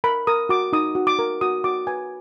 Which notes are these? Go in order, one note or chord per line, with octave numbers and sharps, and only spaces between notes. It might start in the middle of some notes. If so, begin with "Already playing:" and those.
A#4 B5
A#4 D#6
F#4 D6
D#4 D#6
F#4
D6
A#4
F#4 D#6
F#4 D6
B4 G#5